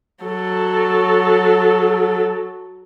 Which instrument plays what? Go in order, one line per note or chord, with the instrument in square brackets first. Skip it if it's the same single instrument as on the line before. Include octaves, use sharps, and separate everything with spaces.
[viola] F#3 A4